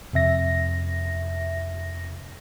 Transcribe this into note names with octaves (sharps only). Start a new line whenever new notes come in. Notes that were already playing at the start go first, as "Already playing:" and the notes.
F2 C3 E5 A#6